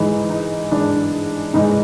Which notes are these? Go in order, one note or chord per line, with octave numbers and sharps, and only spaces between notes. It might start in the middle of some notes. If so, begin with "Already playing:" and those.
Already playing: G#2 E3 G#3 D#4
D#4
G#2 E3 G#3 D4
G#2 E3 G#3 D#4